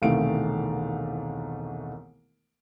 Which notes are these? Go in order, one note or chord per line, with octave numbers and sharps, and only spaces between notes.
E1 C2 D#3 A3 F5 D7